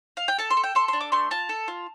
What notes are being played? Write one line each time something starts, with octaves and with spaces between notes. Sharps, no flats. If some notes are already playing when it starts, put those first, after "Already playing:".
F5
G5
A4 A5
C6
A4
G5
A4 C6
D4 C6
D6
A3 C6
F4 A5
A4
F4